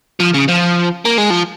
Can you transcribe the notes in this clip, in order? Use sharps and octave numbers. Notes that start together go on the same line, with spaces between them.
F3
C#3
F3
A#3
G#3
F3